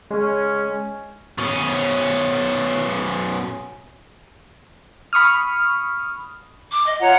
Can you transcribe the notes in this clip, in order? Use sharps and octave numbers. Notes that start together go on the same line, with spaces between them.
C#3 G#3 C#4
B2 C#4
B5 C#6 D#6 F6
D6
D#5
F4 C#5 F#5 A#5